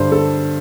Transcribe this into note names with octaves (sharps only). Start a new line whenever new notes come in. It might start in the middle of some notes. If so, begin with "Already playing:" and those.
Already playing: G2 D3 C5 D5
A4